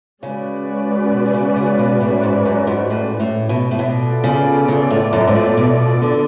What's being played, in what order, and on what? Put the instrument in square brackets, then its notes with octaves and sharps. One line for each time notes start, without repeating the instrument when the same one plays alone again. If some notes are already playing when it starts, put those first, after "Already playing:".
[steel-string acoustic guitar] C#3 [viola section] G#3 C#4 F#4 B4 D5
[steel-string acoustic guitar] B2
C#3
C#3
B2
A2
G#2
F#2
G#2
A2
A2
B2
A2
[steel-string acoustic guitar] B2 [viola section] B3 F4 A4 D5
[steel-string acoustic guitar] C#3
C#3
A2
F#2
G#2
A2
B2
D3